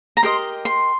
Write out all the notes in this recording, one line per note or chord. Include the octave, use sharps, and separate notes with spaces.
A#5
G4 A#4 D#5 C6
C6